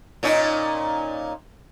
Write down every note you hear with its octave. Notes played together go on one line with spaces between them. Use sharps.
A#2 C#4 D#4